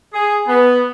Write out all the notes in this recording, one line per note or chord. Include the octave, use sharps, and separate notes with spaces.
G#4
B3